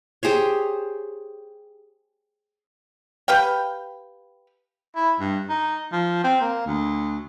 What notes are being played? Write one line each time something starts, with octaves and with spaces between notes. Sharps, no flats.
G4 G#4 C5 C#5
G4 B4 F5 G5
E4
G2
D#4
F3
C4
A#3
D2